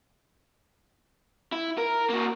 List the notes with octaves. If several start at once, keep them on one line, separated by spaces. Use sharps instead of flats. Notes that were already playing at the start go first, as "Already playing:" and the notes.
E4
A#4
A#3 F#4